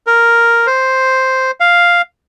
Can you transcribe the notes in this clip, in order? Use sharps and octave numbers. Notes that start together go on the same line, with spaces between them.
A#4
C5
F5